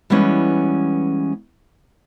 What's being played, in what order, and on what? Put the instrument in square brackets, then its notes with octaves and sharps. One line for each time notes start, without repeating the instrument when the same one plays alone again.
[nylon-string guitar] E3 G3 G#3 B3 C#4